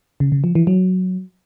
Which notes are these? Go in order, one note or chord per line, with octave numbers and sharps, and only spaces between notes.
C#3
C#3
F3
E3
F#3